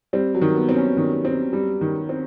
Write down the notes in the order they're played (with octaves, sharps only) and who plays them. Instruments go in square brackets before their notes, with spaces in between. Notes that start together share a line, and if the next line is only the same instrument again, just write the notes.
[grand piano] G3 [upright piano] C4
[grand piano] F#3
[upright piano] D#3
[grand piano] B3
[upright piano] C4
[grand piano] C#4
[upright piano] D#3
C4
G3
D#3
C4